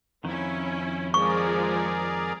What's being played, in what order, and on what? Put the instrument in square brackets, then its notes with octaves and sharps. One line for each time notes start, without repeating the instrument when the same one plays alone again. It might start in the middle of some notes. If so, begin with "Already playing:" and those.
[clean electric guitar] F2 D#3 [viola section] C#4 E4
[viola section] F3 G#3 [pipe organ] G#4 A#4 D5 [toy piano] C#6